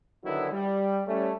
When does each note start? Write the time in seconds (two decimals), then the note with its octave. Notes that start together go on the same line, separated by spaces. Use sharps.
0.23 D3 D#3 F#3 B3 E4 F#4
0.51 G3
1.06 G3 A3 C#4